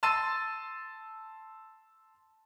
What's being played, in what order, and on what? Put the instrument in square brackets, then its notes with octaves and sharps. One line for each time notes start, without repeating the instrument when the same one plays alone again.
[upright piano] A5 C6 E6 A6 D#7